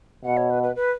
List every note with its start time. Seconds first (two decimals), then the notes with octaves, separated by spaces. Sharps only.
0.25 B2 F#5
0.37 C#5
0.50 B4
0.63 B4
0.76 B4